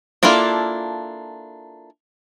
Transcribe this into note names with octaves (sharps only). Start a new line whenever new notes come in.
A#3 D4 E4 F4 A4